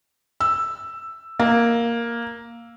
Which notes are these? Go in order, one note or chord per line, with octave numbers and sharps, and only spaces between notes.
E6
A#3